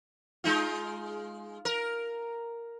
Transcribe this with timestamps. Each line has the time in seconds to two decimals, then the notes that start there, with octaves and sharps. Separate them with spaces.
0.44 G#3 D#4 F4
1.65 A#4